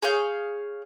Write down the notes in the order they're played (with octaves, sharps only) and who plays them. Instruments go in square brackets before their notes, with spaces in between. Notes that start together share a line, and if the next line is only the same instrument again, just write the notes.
[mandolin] G#4 C#5 F5 G6